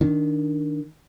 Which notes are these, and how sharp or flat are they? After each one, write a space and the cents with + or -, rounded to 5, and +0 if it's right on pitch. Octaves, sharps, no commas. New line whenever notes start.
D#3 +0 D4 +0